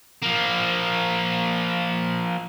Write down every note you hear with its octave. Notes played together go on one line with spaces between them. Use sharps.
F3 A#3